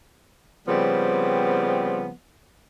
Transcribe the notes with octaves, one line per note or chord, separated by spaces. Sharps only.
C#3 F3 G3 B3 C4